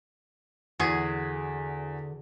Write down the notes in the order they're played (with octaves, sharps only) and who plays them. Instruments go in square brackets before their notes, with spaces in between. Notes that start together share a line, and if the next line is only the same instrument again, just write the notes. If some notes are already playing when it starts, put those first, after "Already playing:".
[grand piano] E2 G#6 [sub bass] D3 [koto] F#4 G#4